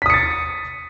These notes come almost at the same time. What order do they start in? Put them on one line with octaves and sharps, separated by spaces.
B6 D#6 C#7 A6